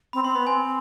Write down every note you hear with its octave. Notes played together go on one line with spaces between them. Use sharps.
C4 B5
C4 C6
B3 B5
C4 G#5